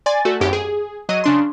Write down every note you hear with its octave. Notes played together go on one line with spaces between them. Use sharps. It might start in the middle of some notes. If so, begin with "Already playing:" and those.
D5 G#5 C6 A6
A3 F#4 A4
G#1 F#2 G4 D7
G#4
F#3 D#5 D#7
C#3 D4 C6